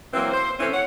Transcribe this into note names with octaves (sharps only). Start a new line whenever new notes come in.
E3 F#3 A#3 C4
C5
E3 A3 C4 C#4
C#5 F#5